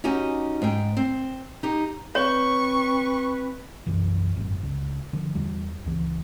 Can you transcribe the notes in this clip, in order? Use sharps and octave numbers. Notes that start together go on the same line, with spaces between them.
C#4 D#4 F#4 G4 G#5
G#2 G5
C4
D#4 G4
C4 B4 C#5 C#6
B1 F#2 E3
G#1 F#2
C#2
D3 F3
E2 G3
C#2 E3